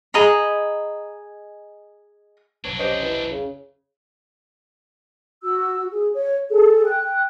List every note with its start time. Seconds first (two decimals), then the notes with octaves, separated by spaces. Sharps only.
0.14 G#4 D#5 A#5 B5
2.65 F1 B1 F2 F#3 D4 C#5
2.79 C#4 G4 C5 D#5
3.02 E3
3.31 C#3
5.43 F#4 E6
5.90 G#4
6.14 C#5
6.50 G#4 A4
6.85 G5 F#6